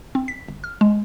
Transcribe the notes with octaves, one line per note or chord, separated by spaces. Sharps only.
C4
B6
G1
F6
G#3